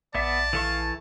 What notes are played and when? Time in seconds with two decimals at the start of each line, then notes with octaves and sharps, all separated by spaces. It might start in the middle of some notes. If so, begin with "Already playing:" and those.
0.15 A#1 B3 D5 E5 A5
0.53 E3 A4 F5 C#6